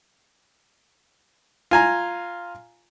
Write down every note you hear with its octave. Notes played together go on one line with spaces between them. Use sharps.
F4 G#5 A#5